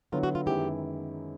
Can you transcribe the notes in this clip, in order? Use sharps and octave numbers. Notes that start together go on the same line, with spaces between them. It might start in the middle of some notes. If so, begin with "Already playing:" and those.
D3 F#3 B3 E4 F4
F#4
F4
F#2 D#3 G#3 B3 E4 G4